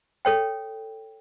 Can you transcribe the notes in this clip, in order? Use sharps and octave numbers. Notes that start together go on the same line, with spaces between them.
A4 C#5 G5